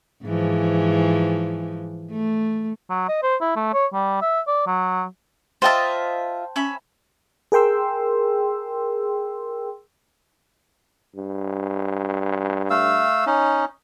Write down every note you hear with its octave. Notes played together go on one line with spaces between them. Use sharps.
G#2 E3 F3
A3
F#3
D#5
C5
E4
A3
C#5
G3
E5
D5
F#3
F4 C5 D#5 E5 G5 A5
C#4 E5 B5
G#4 A#4 G5 C6 E6
G2
A3 F5 E6
C#4 D#4